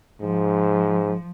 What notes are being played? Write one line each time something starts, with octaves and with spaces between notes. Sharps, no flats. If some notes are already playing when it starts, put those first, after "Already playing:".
G#2 F3